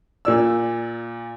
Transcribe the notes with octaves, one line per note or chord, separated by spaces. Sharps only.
A#2 D5 E6